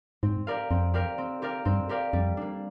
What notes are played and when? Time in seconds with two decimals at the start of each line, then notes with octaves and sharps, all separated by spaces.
0.23 G#2 C4
0.47 G4 A#4 D5 F5
0.70 F2 C4
0.94 G4 A#4 D5 F5
1.18 C4
1.42 G4 A#4 D5 F5
1.65 G2 C4
1.89 G4 A#4 D5 F5
2.13 F2 G3
2.37 A#3 D4